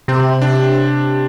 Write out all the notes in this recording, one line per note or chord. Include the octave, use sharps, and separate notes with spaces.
C3 C4
D4